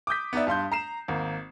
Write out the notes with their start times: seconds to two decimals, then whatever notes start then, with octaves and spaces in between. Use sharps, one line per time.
0.07 D6 D#6 G6 B6
0.33 B3 D#4 D5 E5
0.47 G2 F5 C6 G6
0.72 A#5 C7 E7
1.08 G#1 A#3